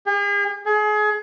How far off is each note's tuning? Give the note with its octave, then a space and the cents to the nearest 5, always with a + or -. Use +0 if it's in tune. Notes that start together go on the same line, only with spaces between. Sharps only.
G#4 -45
G#4 +30